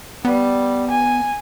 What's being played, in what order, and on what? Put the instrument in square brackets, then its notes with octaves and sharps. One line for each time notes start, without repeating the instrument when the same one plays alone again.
[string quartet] G3 [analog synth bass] B3
[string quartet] G#5